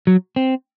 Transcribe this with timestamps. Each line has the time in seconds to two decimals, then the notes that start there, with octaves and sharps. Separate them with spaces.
0.07 F#3
0.36 C4